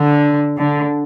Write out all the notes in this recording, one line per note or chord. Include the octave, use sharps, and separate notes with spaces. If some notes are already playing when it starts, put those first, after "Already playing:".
Already playing: D3
D3